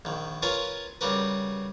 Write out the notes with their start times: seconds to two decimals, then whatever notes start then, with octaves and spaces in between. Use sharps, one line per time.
0.05 A#1 D#3
0.42 F4 A#4 B4 C#5 G#5
1.01 C#3 G3 F#4 A#4 B4